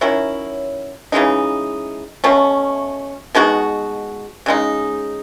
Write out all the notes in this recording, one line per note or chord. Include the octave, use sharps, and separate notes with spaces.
D#3 F#3 C#4 E4
C#3 E3 G#3 D#4
B2 A3 C#4
B2 G#3 D#4 F#4
C#3 G#3 D#4